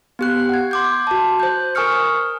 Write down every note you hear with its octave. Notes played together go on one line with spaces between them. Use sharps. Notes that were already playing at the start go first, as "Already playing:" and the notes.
B3 G4 F#6
F#5 G#6
C6 D6 G6
F#4 A5
C5 G6
A#4 G#5 C#6 D#6 F6 C#7